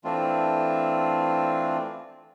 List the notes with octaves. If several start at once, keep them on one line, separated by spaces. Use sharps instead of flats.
E3 A3 C4 D4 F4